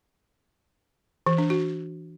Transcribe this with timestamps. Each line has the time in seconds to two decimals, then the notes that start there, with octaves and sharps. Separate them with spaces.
1.27 E3
1.38 D4
1.50 F#4